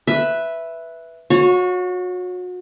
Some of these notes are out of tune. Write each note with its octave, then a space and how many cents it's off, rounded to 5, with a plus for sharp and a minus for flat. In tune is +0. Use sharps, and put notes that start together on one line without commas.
B4 +0 E5 +0
F#4 -35 C#5 +0